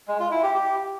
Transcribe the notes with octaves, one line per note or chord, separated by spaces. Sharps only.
G#3
F4
E4
G4
G4